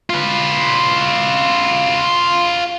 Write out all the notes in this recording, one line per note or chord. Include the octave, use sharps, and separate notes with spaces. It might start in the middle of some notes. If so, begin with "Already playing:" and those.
F4 B4